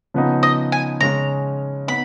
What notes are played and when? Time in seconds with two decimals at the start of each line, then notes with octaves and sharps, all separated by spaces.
0.14 C#3 F3 B3 D#4
0.43 D#5
0.72 G#5
1.01 C#3 G#3 C#4 A#5
1.88 B3 D#4 B5